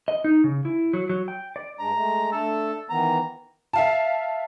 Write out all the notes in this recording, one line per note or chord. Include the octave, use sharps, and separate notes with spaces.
D#5
D#4
C#3
E4
F#3
F#3
G5
D5
G2 G#3 D4 A#5
G#3 A3
A3 D4 A4
D#3 E3 B3 A#5
E5 F5 A5